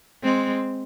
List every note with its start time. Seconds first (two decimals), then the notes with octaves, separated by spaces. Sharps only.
0.23 G#3 C4